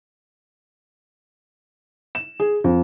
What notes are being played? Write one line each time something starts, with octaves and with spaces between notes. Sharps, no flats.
E7
G#4
F2